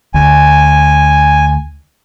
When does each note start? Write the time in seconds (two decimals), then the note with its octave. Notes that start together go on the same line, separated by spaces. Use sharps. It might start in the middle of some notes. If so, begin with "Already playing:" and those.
0.14 D2 G#5